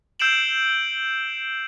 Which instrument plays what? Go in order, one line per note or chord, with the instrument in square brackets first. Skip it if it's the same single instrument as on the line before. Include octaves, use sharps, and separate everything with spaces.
[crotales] E6 G6 C7 D7 E7 F#7